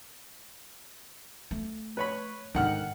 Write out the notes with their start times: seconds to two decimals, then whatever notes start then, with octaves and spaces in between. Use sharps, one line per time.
1.51 A3
1.97 B4 C#5 B5
2.55 G#2 D3 D#3 F#5 F6